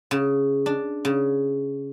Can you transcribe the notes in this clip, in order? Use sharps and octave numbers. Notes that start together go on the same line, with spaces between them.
C#3
D4
C#3